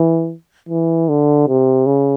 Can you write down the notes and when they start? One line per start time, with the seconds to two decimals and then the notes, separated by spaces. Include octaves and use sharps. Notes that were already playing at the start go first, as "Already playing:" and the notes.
Already playing: E3
0.69 E3
1.09 D3
1.48 C3
1.86 C#3